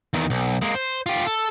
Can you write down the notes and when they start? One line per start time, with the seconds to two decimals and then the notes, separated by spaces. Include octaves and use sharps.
0.14 E2 D#3
0.30 B1
0.62 G#3 A#3
0.75 C5
1.06 F4 G4
1.26 A4